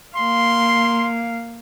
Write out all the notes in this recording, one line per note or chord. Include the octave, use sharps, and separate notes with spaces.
A#3 F5 C6